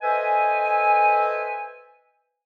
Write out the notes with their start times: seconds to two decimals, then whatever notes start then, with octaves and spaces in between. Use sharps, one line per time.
0.02 A4 B4 C5 D#5 E5 G#5